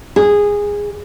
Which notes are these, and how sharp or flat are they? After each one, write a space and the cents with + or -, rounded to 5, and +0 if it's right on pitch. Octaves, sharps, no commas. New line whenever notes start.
G#4 -15